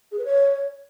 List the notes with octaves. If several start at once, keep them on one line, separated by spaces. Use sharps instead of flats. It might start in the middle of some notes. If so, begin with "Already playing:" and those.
G#4
B4
C#5